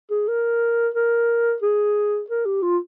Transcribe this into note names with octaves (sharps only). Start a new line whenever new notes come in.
G#4
A#4
A#4
G#4
A#4
G4
F4